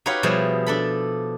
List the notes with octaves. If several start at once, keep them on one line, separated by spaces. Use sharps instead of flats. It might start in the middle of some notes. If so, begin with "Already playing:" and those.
D#4 F#4 G4 B4 C#5 F5
B2 F3 G3 E4 G#4
D4 A4 B5